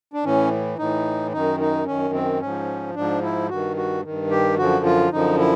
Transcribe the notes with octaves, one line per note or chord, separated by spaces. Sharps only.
D4
A2 E3 C#4
A2 E3 D#4
F#2 D#3 D#4
D#4
F#2 D#3 C#4
C4
G#2 F3 C#4
G#2 F3 D4
E4
G2 D#3 F#4
F#4
G2 D#3
G4
F#2 D3 F3 F#4
F4
F#2 D3 F3 D#4
E4